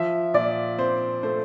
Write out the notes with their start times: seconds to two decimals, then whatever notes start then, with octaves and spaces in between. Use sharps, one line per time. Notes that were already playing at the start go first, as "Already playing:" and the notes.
Already playing: F3 E5
0.34 A#2 D5
0.78 C4 C5
1.23 A3 C5